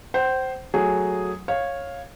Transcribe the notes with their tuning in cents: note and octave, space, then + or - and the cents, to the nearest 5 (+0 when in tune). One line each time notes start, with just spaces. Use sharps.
C5 +0 G5 -45
F#3 +0 A3 +0 G#4 +0
C#5 -10 F5 +5